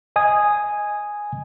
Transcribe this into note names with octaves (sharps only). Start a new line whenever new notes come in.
D#5 G#5 D#6 G#6